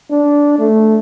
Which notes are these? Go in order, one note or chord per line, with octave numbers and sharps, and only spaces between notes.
D4
A3